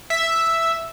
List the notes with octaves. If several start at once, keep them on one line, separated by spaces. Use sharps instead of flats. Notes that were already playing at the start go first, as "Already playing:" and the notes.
E5